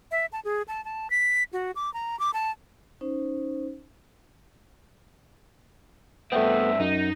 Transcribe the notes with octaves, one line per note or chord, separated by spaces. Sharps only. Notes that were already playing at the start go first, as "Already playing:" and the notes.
E5
A5
G#4
A5
A5
B6
F#4
D6
A#5
D6
A5
C#4 D#4 C5
G2 A3 B3 C4 E5
F#2 D#4